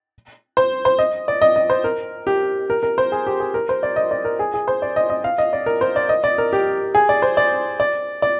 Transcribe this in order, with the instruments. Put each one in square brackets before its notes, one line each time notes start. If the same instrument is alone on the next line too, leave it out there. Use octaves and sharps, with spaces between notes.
[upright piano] C5
C5
D#5
D5
D#5
D#5
C5
A#4
G4
A#4
A#4
C5
G#4
G4
G#4
A#4
C5
D5
D#5
D5
A#4
G#4
G#4
C5
D5
D#5
D#5
F5
D#5
D5
A#4
C5
D5
D#5
D5
A#4
G4
G#4
D5
C5
D5
D5
D5